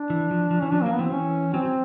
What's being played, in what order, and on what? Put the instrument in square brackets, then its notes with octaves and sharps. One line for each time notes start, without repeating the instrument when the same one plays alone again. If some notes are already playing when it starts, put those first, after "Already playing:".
Already playing: [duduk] D4
[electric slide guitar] E3
F3
F3
[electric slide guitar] E3 [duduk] C#4
[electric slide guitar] F3 [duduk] D4
[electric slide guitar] F#3 [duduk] A#3
[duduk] B3
[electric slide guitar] E3 [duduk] C4
[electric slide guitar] E3 [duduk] C#4
[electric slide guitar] F#3 [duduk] C4
[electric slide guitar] F#3